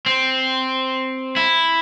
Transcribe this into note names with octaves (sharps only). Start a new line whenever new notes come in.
C4
E4